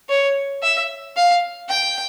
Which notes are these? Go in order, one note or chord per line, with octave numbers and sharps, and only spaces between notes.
C#5
E5
F5
G5